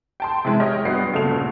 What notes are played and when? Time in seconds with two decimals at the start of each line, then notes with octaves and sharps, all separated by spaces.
0.20 G5 A5 C6
0.45 C3 E3 G#3
0.60 G4 C#5 D#5 F6
0.85 G2 F#3 B3 D#6 C7
1.13 D2 A#2 C#3 A3 A4 F7